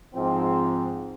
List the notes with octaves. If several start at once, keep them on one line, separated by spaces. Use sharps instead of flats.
G#2 F3 C4